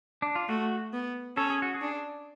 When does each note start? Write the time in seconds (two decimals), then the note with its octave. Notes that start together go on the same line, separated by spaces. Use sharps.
0.22 D4
0.36 F4
0.49 A3 F#4
0.93 B3
1.37 C#4 A4
1.50 G#4
1.62 F#4
1.74 G#4
1.81 D4